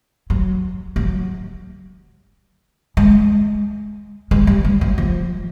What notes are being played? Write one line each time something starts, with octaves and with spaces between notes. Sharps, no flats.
F#3
F#3
G#3
G#3
G3
G3
F#3
F3